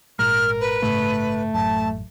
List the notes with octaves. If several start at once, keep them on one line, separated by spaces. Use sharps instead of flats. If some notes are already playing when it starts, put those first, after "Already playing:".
G#1 A#2 G#3 A#4 F6
B4
G1 A2 C#3 A3
A1 F#2 A5